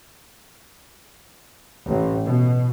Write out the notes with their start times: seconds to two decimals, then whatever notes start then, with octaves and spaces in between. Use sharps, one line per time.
1.86 A1
2.24 B2